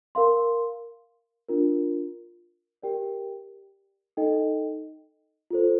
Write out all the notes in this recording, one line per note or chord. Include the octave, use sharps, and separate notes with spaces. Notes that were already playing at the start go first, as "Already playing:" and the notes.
A#4 F5 C6
D4 F4 A#4
G4 A#4 D5 G5
D#4 A4 D#5 G5
F4 A4 C5